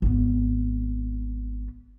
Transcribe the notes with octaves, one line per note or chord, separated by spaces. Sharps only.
G#1 B3